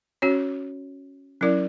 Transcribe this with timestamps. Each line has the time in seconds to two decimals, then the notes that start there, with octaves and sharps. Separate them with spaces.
0.22 C#4 F#4 C#5
1.41 F#3 C#4 E4 A#4 D5